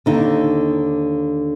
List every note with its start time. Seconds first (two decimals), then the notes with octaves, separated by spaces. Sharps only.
0.06 D#2 D3 D#4